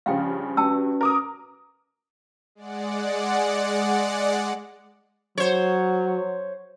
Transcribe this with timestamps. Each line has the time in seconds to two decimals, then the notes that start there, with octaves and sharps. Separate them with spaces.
0.06 G2 C#3 F3 F5 G5
0.57 G2 C#4 F#4 B4 G5 A5 E6
1.01 A#4 D6 D#6
2.55 G#3 D5 F#5
5.38 F#3 C5 C#5